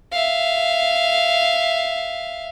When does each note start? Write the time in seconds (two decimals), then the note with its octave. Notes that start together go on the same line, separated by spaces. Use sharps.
0.12 E5 F5